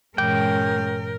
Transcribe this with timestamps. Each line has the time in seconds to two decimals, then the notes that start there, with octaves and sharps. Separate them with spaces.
0.18 G2 A#2 E3 G#3 C#4 A#4 G5